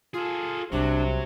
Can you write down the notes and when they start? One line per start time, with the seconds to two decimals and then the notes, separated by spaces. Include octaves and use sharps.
0.14 F4 G#4 A4
0.72 C2 C3 F#3 D4